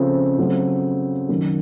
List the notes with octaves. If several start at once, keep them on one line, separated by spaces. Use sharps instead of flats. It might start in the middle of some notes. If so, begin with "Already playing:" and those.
Already playing: C#3 F3 A3 C4
C#3 F#3 A3 C4 F4
F#2 D#3 F#3